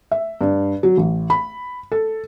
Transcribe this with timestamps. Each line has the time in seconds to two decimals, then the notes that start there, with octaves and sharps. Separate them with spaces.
0.11 E5
0.41 G2
0.83 F#3
0.97 A1
1.30 B5
1.92 A4